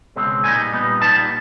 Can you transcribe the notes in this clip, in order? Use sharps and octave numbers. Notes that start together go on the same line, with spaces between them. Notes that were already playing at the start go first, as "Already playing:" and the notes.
C#2 B2 G#3 C4
A#2 G3 B3 D#4 G#5
A#2 G3 B3 D#4
A#2 G3 B3 D#4 A5